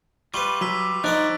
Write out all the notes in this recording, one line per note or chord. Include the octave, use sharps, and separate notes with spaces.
G3 F4 B4 C#6 F#7 G7
F#3 D6 E6 B6
F3 D#4 A#4 D5 F#6 A6 D7